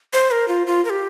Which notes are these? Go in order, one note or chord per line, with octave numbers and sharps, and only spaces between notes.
C5
A#4
F4
F4
A#4
G4